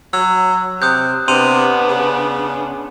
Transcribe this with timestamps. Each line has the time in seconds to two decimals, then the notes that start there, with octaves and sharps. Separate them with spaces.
0.13 F#3 E6
0.82 C3 D#6 F#6 G6
1.28 C3 B3 D4 C6 D#7 F7
1.88 C#3